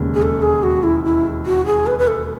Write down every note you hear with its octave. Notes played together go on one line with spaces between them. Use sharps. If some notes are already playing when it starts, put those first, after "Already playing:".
Already playing: E1 D#2 C#3 G#3
G#4
A4
G#4
F#4
E4
E4
F#4
G#4
B4
B4
A4